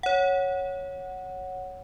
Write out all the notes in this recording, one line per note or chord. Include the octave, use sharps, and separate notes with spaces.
C#5 F#5